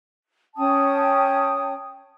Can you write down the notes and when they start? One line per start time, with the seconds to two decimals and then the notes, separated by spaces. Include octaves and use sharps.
0.57 C#4 G5 A5 D#6